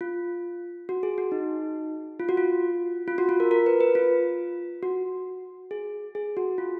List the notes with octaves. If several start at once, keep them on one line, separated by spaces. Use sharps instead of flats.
F4
F#4
G#4
F#4
D#4
F4
F#4
F4
F4
F#4
F4
A#4
A#4
B4
B4
F4
F#4
G#4
G#4
F#4
F4